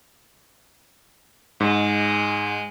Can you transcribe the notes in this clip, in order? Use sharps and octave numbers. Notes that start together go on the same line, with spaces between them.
G#2 G#3